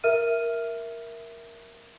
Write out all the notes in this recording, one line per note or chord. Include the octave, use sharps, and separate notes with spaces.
A#4 E5 F6 D#7